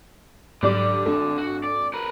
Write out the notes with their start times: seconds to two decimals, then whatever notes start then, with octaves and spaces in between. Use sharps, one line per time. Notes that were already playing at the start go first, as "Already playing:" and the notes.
0.63 G#2 D3 F#3 G3 D5 D6
1.06 G#1 D4 A4
1.38 F#4
1.64 D5
1.94 A#4 B4